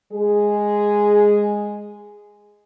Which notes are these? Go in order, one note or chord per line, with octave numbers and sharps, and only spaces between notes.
G#3 G#4